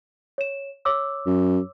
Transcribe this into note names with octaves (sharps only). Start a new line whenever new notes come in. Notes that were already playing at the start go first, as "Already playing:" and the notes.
C#5 E7
C#5 D6 E6
F#2